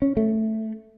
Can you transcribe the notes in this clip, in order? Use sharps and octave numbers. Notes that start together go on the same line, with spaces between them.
C#4
A3